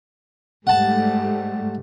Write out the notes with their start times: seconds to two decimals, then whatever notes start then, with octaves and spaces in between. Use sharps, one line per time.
0.67 G#2 G3 A3 F#5 A5